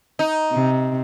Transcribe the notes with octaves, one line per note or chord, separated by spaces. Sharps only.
D#4
C3